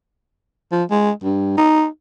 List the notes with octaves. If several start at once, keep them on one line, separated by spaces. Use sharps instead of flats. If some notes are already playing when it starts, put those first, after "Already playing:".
F3
G#3
G2
D#4